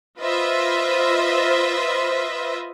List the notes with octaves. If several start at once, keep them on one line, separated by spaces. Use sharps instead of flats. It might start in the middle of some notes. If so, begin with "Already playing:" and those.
F4 B4 C5 D#5 E5